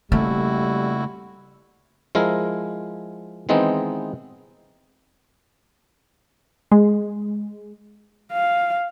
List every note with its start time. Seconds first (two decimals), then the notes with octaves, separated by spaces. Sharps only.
0.12 F2 C#3 G3 A3 A#3 C#4 E4 F#4
2.15 F3 G#3 E4 A#4
3.49 D#3 E3 G#3 B3 C4 D#4
6.72 G#3
8.32 F5